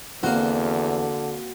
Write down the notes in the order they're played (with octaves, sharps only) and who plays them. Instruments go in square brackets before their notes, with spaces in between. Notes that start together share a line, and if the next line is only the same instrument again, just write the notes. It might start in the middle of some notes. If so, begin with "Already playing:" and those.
[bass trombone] E2 [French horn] D3 [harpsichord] A#3 C4 [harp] F#4